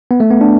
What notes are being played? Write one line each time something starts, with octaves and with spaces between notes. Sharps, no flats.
B3
A3
B3
D4